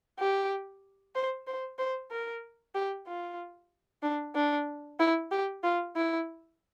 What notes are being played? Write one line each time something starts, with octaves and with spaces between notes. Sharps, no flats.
G4
C5
C5
C5
A#4
G4
F4
D4
D4
E4
G4
F4
E4